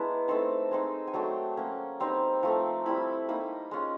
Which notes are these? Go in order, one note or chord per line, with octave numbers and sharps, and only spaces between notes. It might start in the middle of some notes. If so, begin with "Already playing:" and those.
Already playing: G#3 B3 D4 E4 A#5
A3 C4 D#4 A5
G#3 C4 D#4
G#5
F#3 A3 D4 G5
F#3 A#3 C#4
G3 C4 D#4 A#5
F3 A3 C4 A#5
G3 C4 E4 B5
A#3 D#4 B5
G#3 C#4 F4